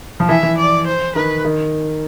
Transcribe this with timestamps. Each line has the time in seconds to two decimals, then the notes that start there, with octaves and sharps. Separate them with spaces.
0.20 F3
0.28 E3 E5
0.43 E3
0.58 D5
0.86 C5
1.15 D#3 B4
1.44 D#3